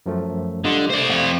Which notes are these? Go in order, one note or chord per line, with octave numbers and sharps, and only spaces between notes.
F#2 F3 A3
D3 G3 F4 D#5
A3 C5 D5
C4 F5